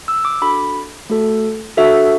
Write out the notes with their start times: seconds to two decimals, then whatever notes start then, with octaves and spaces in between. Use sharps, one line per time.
0.08 E6
0.25 D6
0.41 D4 F#4 A4 B5
1.10 A3 F#4 A4
1.77 D4 F#4 A4 E5